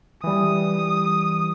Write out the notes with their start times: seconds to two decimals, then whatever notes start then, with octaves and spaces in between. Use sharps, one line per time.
0.24 E3 G3 D#6